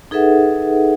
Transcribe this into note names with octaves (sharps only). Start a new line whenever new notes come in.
D#4 G#4 A4 B4 E5 F#5